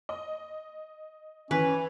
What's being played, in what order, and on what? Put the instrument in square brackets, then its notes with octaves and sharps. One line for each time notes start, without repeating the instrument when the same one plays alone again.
[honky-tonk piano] D#5
[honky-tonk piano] E3 [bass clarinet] C#4 [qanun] B4